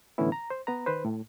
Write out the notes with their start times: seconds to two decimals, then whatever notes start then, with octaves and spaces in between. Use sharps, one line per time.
0.18 A2 D3 E3 B3 C#4 E4
0.32 A#5
0.50 C5
0.67 B3 B4 A#5
0.86 D#3 B4 C5
1.05 A2